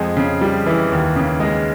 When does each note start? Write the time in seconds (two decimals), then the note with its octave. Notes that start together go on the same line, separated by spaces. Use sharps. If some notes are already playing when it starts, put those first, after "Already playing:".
Already playing: F2 G#3
0.17 C#3
0.41 G3
0.66 E3
0.92 D#2
1.16 C#3
1.40 G#3